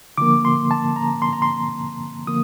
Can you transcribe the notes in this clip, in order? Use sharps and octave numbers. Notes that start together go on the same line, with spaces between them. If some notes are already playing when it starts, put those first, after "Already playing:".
D3 F3 A#3 D6
C6
A5
A#5
C6
A#5
C6
D3 F3 A#3 D#6